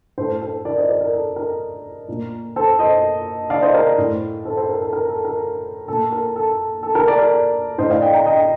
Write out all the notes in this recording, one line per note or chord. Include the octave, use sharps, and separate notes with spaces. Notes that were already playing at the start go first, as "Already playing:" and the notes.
A2 A4 C5
A4 C5
A#4 D5
C5 D#5
A#4 D5
A#4
A4
A#4
A#2
A4 C5
C5 D#5
D5 F5
C5 D#5
A#4 D5
A2
A4 C5
A4 C5
A#4
A4
A#4
A4
A#4
A#2 A4
A#4
A4
A4
A#4
A#4 D5
A#4 D5
A2 C5 D#5
D5 F5
D#5 G5
G5 A#5
D#5 G5